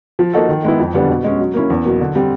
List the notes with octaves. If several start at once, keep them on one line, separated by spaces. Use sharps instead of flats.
F3
A#3 D#4 F#4 A4
D#3
G#3 B3 E4
F2
D3 G3 B3 D4
B2
G#3 C#4
F#3
A#3 C#4 E4
E2
B2 F#3 A#3
D3
G3 C4